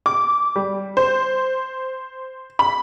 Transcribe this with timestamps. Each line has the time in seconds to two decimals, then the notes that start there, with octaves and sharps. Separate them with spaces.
0.06 D6
0.56 G3
0.97 C5
2.59 B5